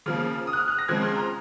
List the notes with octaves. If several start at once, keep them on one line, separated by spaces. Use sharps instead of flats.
C#3 F3 A#3 F6
D#6
F#6
F6
F#6
A#6
C#3 F3 G#3 C4 G#6
C6
A#5